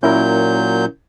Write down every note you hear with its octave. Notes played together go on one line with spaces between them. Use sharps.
A#2 F#3 C#4 E4 A#4 G6